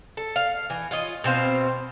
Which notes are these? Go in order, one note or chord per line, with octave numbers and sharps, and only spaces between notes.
A4
F5
E3
F4 C#5 D#5
B2 C4 C5 F5